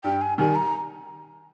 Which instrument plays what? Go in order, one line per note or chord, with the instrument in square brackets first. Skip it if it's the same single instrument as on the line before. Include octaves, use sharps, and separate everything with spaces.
[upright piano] G2 [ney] G5
[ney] G#5
[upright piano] D#3 G3 [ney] G#5
[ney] A#5